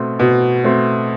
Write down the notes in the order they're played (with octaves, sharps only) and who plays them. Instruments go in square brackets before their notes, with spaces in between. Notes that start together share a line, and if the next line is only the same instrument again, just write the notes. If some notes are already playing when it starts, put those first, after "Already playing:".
Already playing: [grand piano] B2 A3 C4
B2
A3 C4